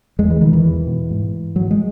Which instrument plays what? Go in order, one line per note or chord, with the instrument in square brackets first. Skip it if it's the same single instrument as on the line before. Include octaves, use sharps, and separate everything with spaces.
[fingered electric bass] E2 G#3
E3
B2 D#3
E3
E2
B2
G#2
G#2 F#3
G#3